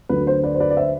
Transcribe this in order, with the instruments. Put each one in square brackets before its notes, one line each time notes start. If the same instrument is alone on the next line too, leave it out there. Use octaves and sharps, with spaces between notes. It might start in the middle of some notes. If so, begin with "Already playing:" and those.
[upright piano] D2 D3 F#3 B4
C5
B4 D5
C5
B4 D5
D5
C5 E5